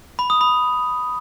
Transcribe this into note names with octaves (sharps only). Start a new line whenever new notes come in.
B5
D#6
B5